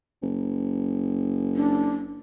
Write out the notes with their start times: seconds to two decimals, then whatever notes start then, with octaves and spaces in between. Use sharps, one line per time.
0.22 F#1
1.56 D4